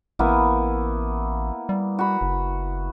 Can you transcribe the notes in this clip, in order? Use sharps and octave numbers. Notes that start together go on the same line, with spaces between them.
A1 A#3 B3 E4
G3
F#4 B5
F#1